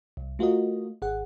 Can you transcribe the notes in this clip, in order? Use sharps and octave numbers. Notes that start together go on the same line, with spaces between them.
C2
A3 F4 F#4 A#4 D#5
G#1 G#4 F#5